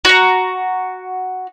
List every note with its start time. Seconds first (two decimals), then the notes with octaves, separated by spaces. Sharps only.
0.05 F#4 A#5